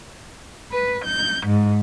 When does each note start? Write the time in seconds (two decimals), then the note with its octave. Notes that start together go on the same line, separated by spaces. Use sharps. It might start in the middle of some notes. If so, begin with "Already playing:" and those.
0.72 B4
1.04 G6
1.46 G#2